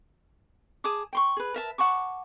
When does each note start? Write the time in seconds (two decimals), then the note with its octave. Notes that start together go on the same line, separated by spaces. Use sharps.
0.84 G#4 A5 D6 D#6
1.13 G5 C6 C#6
1.37 G#4 B4
1.54 A#4 E5 A5
1.78 F#5 A5 C#6 D6